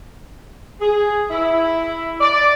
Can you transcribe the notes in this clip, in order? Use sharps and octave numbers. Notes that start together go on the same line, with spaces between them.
G#4
E4
D5